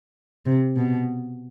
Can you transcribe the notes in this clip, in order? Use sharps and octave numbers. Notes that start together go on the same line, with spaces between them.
C3
B2